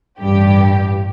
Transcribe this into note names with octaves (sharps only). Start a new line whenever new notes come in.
A1 G2 G4